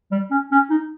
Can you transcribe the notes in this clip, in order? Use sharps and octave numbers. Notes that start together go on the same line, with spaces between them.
G3
C#4
C#4
D#4